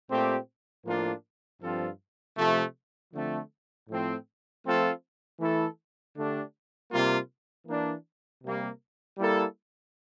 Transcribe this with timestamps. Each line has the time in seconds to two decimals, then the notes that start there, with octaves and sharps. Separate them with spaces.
0.10 A#2 A3 C4 G4
0.85 A2 F3 A#3 D4 F4
1.62 G2 F3 C4 F4 A4
2.37 C3 F3 A3
3.13 D3 F3 A3 C4
3.88 A2 F3 A3 C4
4.64 F3 A3 C4 F4 A4
5.40 E3 A3 E4 A4
6.15 D3 A3 D4 G4
6.92 C3 G3 A#3 F4
7.67 E3 A#3 D4
8.43 C3 G3 A#3
9.18 G3 A#3 E4 A4